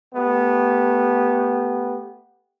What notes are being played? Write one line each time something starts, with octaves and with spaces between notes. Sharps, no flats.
A3 B3 G4